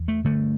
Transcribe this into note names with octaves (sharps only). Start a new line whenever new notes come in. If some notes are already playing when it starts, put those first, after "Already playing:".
Already playing: E2
A3
G2 D3 A3